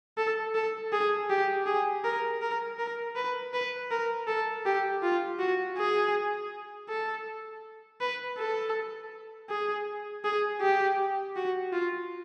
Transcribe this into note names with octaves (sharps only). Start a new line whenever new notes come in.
A4
A4
G#4
G4
G#4
A#4
A#4
A#4
B4
B4
A#4
A4
G4
F4
F#4
G#4
A4
B4
A4
G#4
G#4
G4
F#4
F4